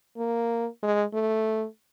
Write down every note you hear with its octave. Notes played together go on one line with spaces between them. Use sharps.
A#3
G#3
A3